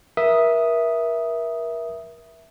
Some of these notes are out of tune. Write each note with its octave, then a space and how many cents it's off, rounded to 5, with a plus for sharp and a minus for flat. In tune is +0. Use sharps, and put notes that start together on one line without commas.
A#4 +35 E5 +0 D#6 +0